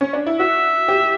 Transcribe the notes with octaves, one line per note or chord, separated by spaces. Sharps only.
C#4
D4
E4
F#4 E5
G4